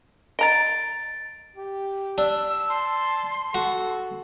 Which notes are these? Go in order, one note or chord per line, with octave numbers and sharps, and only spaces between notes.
D#5 A#5 A6 D7
G4
D4 E6
A5 C6
F#4 A4